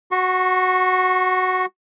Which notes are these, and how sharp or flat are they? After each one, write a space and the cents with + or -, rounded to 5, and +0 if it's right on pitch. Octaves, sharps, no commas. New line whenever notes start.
F#4 +0 C#6 -30